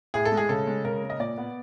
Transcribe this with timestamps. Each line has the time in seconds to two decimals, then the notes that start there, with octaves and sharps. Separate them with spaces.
0.14 A2 G#4
0.25 A4
0.32 G#3
0.37 G#4
0.49 C#3 A4
0.67 G#3
0.84 C#3 A#4
1.03 A#3
1.10 D#5
1.20 A#2 D5
1.38 B3